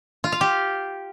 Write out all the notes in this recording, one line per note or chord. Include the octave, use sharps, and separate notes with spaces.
F4
F5
G4